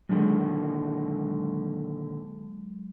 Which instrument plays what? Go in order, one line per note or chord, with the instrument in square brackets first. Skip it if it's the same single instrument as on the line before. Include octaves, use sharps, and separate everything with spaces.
[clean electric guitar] A#2 D3 D#3 [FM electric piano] F#3 G#3